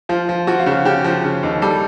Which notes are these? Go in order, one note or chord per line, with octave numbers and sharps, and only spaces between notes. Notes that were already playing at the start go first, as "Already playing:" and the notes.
F3 F4
F3
F3 F#4
F4
C#3
F#4
C#3 G4
F3
C#3
D#2
G3 A4